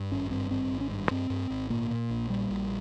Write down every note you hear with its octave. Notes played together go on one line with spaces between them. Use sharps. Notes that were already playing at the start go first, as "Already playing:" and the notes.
Already playing: G2
G#1 C#4
G2 C4
G#1 C4
G#1
C#4
G2
G2 C4
G2
G#1
A#2 A#3
A#2
A#1
A#2 G3
A#1